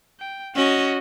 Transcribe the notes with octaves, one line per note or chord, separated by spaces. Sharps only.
G5
C#4 F#4 D#5